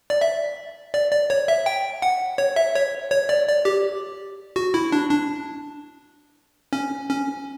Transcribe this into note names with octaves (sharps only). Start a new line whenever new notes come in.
D5
E5
D5
D5
C#5
E5
G5
F#5
C#5
E5
C#5
C#5
D5
D5
G4
F#4
E4
D4
D4
C#4
C#4